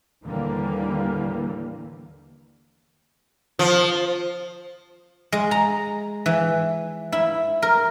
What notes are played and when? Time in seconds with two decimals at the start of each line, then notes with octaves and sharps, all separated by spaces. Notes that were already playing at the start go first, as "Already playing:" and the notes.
0.23 D#2 A2 D3 E3 G3 A#3
3.59 F3
5.32 G#3
5.51 A#5
6.26 E3
7.12 E4
7.62 A#4